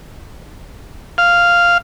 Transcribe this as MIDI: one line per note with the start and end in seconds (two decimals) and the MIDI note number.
1.18 1.78 77